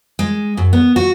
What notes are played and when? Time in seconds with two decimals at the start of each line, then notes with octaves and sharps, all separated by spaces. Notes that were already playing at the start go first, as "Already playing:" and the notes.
0.19 G#3
0.57 F#2
0.73 B3
0.96 F#4